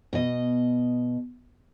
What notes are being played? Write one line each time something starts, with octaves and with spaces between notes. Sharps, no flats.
B2 D#5